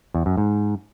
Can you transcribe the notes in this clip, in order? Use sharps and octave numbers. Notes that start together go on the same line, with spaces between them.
E2
F#2
G#2